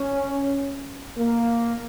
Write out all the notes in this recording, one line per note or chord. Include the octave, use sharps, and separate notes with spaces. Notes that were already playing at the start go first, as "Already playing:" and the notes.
Already playing: C#4
A#3